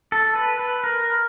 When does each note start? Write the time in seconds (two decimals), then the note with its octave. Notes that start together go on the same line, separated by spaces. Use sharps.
0.12 A4
0.35 B4
0.59 B4
0.84 A#4